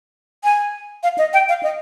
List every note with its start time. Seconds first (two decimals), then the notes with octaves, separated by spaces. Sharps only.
0.44 G#5
1.03 F5
1.18 D#5
1.33 G5
1.49 F5
1.63 D#5